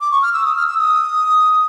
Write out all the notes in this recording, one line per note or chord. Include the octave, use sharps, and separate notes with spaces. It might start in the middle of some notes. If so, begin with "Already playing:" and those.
D6
C#6
F6
E6
D#6
F6
E6
D#6